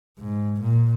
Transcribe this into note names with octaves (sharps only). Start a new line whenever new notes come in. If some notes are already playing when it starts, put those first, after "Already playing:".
G#2
A#2